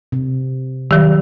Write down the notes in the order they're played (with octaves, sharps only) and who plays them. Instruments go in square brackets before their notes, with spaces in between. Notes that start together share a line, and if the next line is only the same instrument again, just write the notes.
[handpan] C3
[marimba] D#3 F#3 [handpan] G3